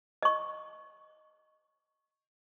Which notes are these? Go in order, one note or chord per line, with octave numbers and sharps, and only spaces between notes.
D#5 C#6